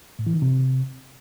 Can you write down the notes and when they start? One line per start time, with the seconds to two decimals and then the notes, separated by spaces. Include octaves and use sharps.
0.19 A2
0.27 E3
0.34 D#3
0.42 C3